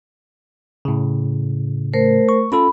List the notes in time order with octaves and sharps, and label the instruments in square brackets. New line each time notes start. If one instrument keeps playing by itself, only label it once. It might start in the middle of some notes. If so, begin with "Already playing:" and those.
[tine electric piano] A2 C#3
[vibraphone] A3 A#4 C5
[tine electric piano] C#6
[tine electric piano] C#4 F4 A4 [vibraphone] B5